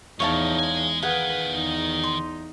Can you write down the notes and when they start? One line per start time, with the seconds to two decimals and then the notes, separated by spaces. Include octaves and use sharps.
0.20 E2 A2 F3 D#4 C#5 F5 A5
0.59 G#3 G#5
1.03 D#3 G#4 B4 F5 F#5
1.48 E2 D#4
2.04 C6